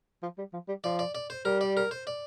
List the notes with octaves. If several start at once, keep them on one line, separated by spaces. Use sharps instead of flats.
F3
G3
F3
G3
F3 D5
D5
D5
C5
G3 A#4
D5
A#4
C5
D5